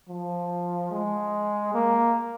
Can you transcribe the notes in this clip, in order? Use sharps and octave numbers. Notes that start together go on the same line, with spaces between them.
F3
G#3
A#3